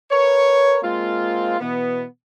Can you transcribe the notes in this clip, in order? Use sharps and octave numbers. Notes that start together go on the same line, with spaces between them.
A#4 B4 C#5
G#3 A#3 C4 F4
B2 E3 B3